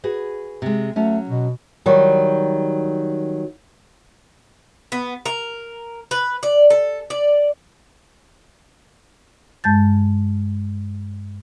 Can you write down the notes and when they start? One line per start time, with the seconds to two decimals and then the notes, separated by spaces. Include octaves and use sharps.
0.04 F#4 G#4 B4
0.62 C3 G#3
0.96 F#3 A3 C#4
1.29 B2
1.86 D#3 F#3 G3
4.92 B3
5.26 A#4
6.11 B4
6.43 D5
6.70 A4
7.10 D5
9.64 G2 G#3 A5 G6 A6